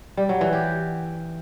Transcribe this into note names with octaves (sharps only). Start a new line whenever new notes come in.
G3
F#3
E3
G4